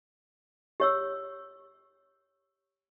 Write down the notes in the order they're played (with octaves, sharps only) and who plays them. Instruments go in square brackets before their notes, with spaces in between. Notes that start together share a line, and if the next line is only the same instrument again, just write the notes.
[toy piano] G4 C#5 E6